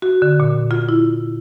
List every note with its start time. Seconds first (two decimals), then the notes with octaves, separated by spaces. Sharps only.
0.02 F#4
0.22 D3
0.40 A#2
0.71 F4
0.89 E4